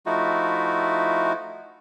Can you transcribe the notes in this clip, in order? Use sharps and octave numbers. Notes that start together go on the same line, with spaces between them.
F3 A3 D#4 E4 F#4